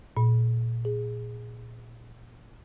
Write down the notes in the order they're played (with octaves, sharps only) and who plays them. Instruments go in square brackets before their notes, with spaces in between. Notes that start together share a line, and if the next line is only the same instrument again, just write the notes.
[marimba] A#2
G#4